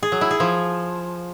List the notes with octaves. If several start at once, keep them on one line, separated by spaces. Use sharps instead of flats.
G#4
F#3
E4
G#4
F3